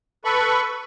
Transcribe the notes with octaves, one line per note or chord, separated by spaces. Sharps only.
A4 B4 B5 C#6